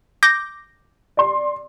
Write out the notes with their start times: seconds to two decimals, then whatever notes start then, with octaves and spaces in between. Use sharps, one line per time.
0.23 D6 G6 A#6
1.17 D5 C6